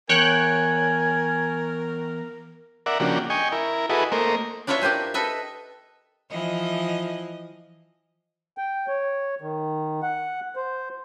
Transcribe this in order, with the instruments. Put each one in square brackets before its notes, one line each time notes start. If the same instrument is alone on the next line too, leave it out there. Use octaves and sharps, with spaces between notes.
[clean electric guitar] E2 [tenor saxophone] A#4 [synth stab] C#5 G5 F#6 [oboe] G#5
[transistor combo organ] A#4 D5 E5 F#5
C#3 F3 A#3 D4 F#4 G4
D#5 G5 G#5 C#6
E4 A#4
E4 F#4 G#4 A4 B4 D#5
A3 A#3 A#4 C5 D#5
[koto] D4 E4 F4 B4 C#5 E5
D4 G4 A#4 C5 G#5
A4 B4 D#5 E5
[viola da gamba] E3 F3 D#5
[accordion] G5
C#5
D#3
F#5
C5